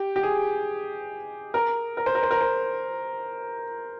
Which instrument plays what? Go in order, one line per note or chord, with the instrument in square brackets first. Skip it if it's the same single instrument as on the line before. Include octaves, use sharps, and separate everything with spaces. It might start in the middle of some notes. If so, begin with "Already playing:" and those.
Already playing: [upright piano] G4
G4
G#4
A#4
A#4
C5
A#4
C5
A#4
C5